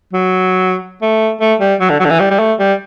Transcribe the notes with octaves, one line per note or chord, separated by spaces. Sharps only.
F#3
A3
A3
G3
F#3
D3
F#3
D3
E3
G3
G3
A3
G3